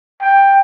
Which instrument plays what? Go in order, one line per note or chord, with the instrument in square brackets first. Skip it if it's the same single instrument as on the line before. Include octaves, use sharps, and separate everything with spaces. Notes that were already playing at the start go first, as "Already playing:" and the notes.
[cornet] G5